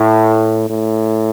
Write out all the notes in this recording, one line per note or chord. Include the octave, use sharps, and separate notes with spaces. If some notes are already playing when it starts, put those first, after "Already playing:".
Already playing: A2
A2